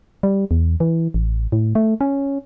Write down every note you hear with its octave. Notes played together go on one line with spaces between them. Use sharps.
G3
E2
E3
A1
A2
A3
C#4